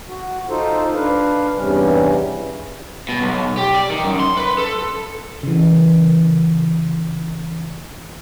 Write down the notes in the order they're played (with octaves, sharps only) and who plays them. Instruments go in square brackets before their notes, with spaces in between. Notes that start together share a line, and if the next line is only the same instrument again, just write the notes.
[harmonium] F#4
D#4 F4 A4 C5
D4 B4 F5
E2 G2 C3 G3 C#4
[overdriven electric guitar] B2
B1
G4
D5
D#3
F#2
C6
B4
A4
[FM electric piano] C#3 E3